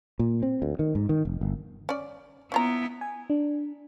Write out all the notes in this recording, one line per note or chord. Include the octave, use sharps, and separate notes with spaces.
A#2
C4
D2
D#3
G#2
D#3
F1
G1
C#4 D5
B3 C#4 E4 F4 A#5
G#5
D4